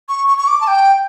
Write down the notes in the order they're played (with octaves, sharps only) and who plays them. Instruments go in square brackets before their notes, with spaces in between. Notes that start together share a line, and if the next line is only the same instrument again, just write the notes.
[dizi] C#6
C#6
C#6
D6
A5
G5